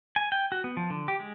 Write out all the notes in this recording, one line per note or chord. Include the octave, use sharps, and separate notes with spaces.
G#5
G5
F#4
B3
F3
D3
G4
G#3